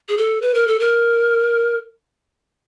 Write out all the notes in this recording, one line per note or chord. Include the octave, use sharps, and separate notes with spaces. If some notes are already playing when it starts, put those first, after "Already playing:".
G#4
A4
B4
A#4
A4
A#4